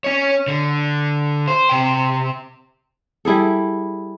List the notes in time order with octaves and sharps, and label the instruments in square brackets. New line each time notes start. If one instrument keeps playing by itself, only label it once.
[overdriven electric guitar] C#4 C#5
D3
C5
C3 G5
[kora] G3 E4 G#4 A4